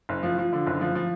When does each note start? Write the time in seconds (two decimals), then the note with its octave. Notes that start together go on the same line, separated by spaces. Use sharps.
0.09 F#1
0.23 F3
0.38 F3
0.53 D3
0.67 F#1
0.81 F3
0.95 F3